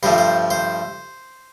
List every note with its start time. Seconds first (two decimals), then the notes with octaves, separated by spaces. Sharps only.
0.03 G2 F3 A3 C5
0.18 C5
0.50 C5